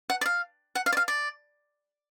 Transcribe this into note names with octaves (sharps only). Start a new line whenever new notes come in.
F#5
D5
F5
F#5
F5
D5
F5
D5